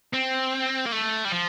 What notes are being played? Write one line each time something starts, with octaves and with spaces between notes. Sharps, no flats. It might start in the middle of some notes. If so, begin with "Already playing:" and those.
C4
A#3
A3
G3
F3